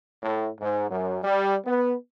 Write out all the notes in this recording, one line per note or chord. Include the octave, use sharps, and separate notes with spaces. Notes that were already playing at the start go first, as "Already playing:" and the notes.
A2
G#2
F#2
G3
B3